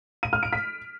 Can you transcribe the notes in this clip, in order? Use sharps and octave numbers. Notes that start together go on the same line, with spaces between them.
D#7
F6
D7
B6